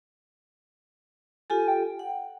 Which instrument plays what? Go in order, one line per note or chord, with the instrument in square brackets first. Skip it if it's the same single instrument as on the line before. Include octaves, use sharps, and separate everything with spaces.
[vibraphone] F4 G4 A4 [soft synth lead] G#5
[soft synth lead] G5
[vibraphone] F#5